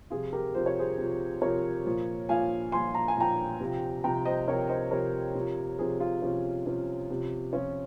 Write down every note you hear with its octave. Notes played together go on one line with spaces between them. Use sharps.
C3 F3 F4 G#4
G4 A#4
C3 F3 C5
C#5
G#4 C5
C3 F3
C3 F3 A#4 C#5
A#2 F3
A#2 F3 F5 G#5
A#2 F3 G#5 C6
A#5
G#5
A#2 F3 G5 A#5
C3 F3
C3 F3 G5 A#5
C5 D#5
C3 F3 A#4 C#5
C5 D#5
C3 F3 A#4 C#5
C3 F3
C3 F3 G#4 C5
F4 G#4
C3 F3 C#4
C3 F3 C#4
C3 F3
C3 F3 C#4 F4